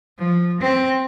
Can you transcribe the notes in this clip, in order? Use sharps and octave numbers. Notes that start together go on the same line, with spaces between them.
F3
C4